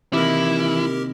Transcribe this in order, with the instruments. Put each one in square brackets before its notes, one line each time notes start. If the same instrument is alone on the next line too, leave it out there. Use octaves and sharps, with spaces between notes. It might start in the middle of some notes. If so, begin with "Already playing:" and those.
[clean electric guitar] C3 D#3 A#3 [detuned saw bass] E3 [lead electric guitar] E4 [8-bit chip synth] G4 A#4